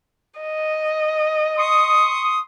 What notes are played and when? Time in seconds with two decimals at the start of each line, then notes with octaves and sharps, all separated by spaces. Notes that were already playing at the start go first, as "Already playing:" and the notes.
0.41 D#5
1.57 C6 C#6 D#6